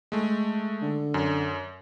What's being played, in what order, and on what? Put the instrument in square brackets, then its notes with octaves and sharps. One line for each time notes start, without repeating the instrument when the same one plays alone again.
[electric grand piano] G#3 A3
[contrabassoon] D3
[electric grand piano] F#2